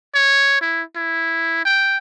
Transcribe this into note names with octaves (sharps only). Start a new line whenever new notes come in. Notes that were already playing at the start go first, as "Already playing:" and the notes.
C#5
E4
E4
G5